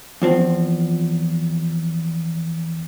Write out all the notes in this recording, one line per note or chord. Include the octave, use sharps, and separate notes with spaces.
E2 F3 C4